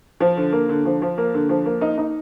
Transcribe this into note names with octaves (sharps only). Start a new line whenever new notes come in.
F3
D3
A#3
D3
F3
F3
A#3
D3
F3
A#3
D#4
D#4